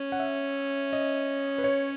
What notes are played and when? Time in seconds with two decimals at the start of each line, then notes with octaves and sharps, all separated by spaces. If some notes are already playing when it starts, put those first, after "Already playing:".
Already playing: C#4
0.12 F#5
0.19 E5
0.93 D#5
1.58 B4
1.64 C#5